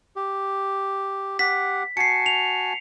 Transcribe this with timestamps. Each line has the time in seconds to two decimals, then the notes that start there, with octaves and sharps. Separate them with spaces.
0.16 G4
1.39 G4 F#5 B6
1.97 F#4 G#5 A5 C7 C#7
2.26 F7